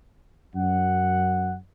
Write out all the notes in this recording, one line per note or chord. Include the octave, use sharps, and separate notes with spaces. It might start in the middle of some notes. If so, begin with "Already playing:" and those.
F#2 F#5